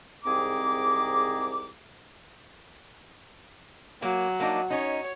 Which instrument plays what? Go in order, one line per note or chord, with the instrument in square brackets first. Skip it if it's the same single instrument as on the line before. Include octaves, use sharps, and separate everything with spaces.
[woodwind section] C2 G#2 C4 G#4 A#5 D6
[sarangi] F#3 [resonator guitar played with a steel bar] A#3
[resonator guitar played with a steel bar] A#3 D4 D#4
[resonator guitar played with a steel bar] C#4 D#4 [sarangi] C#5